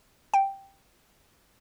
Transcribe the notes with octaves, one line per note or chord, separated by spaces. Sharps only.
G5